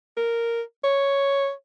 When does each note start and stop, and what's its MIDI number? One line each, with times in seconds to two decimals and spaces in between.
0.17 0.62 70
0.84 1.51 73